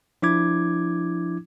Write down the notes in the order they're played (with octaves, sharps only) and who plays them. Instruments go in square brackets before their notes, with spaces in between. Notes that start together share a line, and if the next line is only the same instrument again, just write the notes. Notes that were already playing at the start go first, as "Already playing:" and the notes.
[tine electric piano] F3 D4 E4 D6 G#6